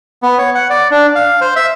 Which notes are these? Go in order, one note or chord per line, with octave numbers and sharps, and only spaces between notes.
B3
C#5
F#5
D5
D4
F5
C5
E5